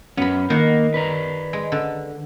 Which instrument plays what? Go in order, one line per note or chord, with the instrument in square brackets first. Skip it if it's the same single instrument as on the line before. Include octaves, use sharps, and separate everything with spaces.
[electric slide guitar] F#2 C#4 [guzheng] B3 B5
[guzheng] D#3 F#5 [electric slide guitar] A#3
[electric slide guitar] B4 D5 A#5
[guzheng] G#3
D3